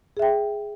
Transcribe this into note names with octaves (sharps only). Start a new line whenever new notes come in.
G#4 E5 G5